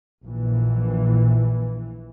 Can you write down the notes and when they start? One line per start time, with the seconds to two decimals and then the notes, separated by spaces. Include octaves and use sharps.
0.25 A#1 E3